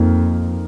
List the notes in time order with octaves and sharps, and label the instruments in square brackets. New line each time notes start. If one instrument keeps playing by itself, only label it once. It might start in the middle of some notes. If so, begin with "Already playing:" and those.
Already playing: [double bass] F2 [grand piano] F3 A#3 D#4